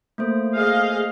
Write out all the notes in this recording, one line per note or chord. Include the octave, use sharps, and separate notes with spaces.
A3 A#3 C5
G#4 D#5 F5